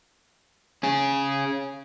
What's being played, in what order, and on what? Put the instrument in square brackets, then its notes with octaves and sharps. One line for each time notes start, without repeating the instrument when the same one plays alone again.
[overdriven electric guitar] C#4 G#4